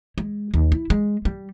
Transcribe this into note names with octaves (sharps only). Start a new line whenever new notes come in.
G#3
D#2
E4
G#3
G3